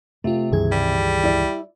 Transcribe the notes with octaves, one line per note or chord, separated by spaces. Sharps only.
C3 A3 F4
C#2 G2 D#3 E3 G#4 G#6
G3
E4 D5